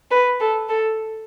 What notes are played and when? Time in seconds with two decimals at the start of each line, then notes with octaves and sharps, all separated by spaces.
0.11 B4
0.40 A4
0.69 A4